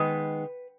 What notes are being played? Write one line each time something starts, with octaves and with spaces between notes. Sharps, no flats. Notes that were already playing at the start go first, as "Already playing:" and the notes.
Already playing: D#3 G#3 B3 B4